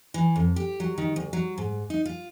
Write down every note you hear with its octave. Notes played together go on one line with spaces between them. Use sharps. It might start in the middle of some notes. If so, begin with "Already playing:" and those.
E3
F2
G4
F#3
D#3
D2
F#3
G#2
D#4
F4